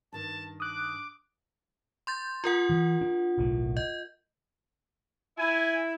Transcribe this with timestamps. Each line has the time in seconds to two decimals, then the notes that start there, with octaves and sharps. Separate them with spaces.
0.13 G2 D#3 D4 A5
0.60 D6 D#6 F#6
2.07 C6 G6 A6
2.44 F4 A#4 F#5
2.70 E3
3.01 D4
3.38 F#1 B1 A2
3.77 D#5 G6
5.38 E4 G#5